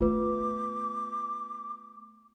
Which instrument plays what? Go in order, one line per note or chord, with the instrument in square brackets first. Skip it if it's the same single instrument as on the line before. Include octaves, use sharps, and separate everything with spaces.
[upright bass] A3 B3 [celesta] F4 B4 [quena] D6